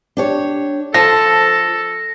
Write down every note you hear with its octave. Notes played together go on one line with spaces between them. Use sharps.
D4 G4 C#5
F3 A4 A5 A#6